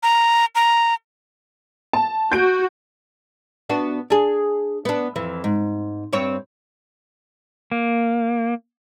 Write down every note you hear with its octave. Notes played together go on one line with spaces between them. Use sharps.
A#5
A#5
A5
F#4 G6 D7
B3 D4 F#4
D4 G#4
B3 D4
F2 E3
G#2
G2 C4 C#5
A#3